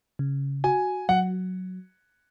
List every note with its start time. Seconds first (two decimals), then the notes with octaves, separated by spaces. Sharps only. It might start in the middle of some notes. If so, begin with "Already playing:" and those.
0.19 C#3
0.64 F#4 G#5
1.09 F#3 F#5